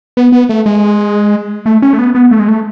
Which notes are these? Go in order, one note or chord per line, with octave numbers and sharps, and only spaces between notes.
B3
B3
A3
G#3
A3
C#4
A3
B3
B3
A3
G#3
A3